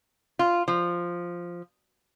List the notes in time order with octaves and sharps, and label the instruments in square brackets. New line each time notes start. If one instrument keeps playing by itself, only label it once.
[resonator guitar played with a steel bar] F4
F3